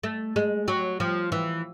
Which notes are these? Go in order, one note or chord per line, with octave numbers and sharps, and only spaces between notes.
A3
G#3
F#3
F3
E3